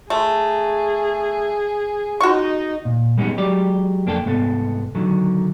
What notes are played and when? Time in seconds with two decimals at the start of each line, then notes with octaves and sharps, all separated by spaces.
0.10 A3 G#4
2.20 D#4 F#4 C#6
2.85 A#2
3.18 G3 G#3 B3 C#4 D#4
3.37 F#3 G#3 G4 D5
4.06 F2 A#3 D4 A4 C#5 G5
4.25 C2 G#2 B3 A4
4.95 D3 D#3 F#3